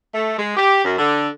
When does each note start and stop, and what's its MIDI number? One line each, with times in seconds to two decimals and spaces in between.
0.14 0.38 57
0.39 0.55 56
0.56 0.82 67
0.84 0.95 42
0.98 1.28 50